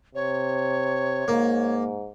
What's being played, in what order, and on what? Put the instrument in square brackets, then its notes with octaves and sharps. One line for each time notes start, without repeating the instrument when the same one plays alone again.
[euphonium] C3 [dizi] C#5
[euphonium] G#2 [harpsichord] A#3